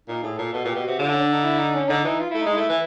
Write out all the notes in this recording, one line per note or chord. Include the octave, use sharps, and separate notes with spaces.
A#2 D#4
A2 G#4
A#2 A4
B2 A4
A#2 G4
B2
C3 F#4
D3 F4
C#4
D4
D#4
E4
D#4
C#4
D3 D#4
E3 D#4
F4
A3 E4
G#3 D#4
A3 E4
E3